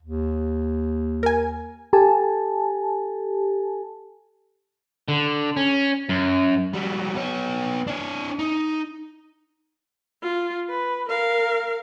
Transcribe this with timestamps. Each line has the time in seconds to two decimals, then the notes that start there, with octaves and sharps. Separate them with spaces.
0.03 D#2
1.23 A#4 G#5
1.93 G4 A4 G#5 A5
5.08 D3
5.57 C#4
6.09 F#2
6.74 F#3 G3
7.15 B3 C#5
7.87 D4 C#5
8.39 D#4
10.23 F4
10.70 B4
11.09 A#4 F5